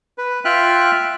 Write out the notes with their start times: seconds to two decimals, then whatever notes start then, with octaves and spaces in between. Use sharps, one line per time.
0.18 B4
0.45 F4 E5 G5 F6 F#6